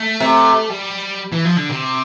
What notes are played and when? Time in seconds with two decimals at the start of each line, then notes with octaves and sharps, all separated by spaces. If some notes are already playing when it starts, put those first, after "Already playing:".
Already playing: A3
0.20 C3
0.70 G3
1.32 E3
1.45 F3
1.57 D3
1.70 C3